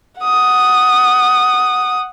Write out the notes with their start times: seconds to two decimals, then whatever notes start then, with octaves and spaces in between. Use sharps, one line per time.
0.21 F#5 D#6